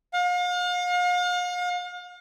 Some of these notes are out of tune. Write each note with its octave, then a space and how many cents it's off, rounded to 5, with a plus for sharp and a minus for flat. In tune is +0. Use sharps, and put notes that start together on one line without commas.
F5 +40